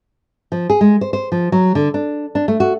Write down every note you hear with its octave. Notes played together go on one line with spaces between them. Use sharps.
F3
G#4
G#3
C5
C5
F3
F#3
D3
D4
D4
A3
F#4